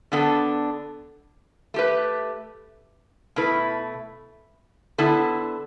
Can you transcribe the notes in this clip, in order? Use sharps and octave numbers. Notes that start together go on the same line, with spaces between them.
D3 B3 D4 A4
A3 G4 B4
B2 A3 E4 B4
D3 B3 E4 A4